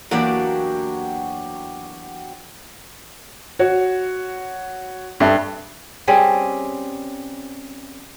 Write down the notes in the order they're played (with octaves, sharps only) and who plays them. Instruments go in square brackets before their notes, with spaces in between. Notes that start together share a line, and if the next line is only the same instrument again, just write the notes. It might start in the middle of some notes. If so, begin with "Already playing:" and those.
[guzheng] E2 D4 D5 [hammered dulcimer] F#3 G4 [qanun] A#3
[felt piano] F#4 C#5
[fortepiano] G2 [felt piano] A4 E5
[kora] G3 C4 C#4 G#4